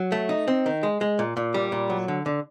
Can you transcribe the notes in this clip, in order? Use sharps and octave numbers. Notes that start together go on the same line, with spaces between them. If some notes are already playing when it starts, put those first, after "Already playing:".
Already playing: F#3
A3
D#4
C4
D#3
G#3
G#3
A#2
A#2
G3
A#2
F#3
D3
D3